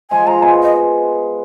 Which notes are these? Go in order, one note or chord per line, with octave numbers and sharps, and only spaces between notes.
F3 G#3 G#5
F3 G#3 A#5
G#3 B3 G#5
D#5